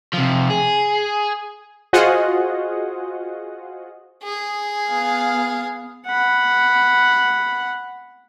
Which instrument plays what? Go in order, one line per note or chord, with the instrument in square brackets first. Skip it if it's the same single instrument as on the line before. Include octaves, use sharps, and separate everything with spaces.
[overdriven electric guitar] C3 F3
G#4
[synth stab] F4 F#4 G#4 C5 D#5 F#5
[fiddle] G#4
[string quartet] B3 F5
[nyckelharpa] F#5 B5